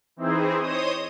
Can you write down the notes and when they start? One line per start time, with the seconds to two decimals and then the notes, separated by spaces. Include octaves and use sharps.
0.16 E3 C4 D#4 E4 G#4 C5
0.59 C5 C#5 D#5 D#6